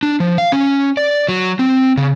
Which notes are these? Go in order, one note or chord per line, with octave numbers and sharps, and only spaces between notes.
D4
F3
F5
C#4
D5
F#3
C4
C#3